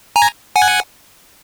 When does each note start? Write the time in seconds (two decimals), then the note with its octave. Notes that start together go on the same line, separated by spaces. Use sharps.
0.16 G#5 A#5
0.56 F#5 G#5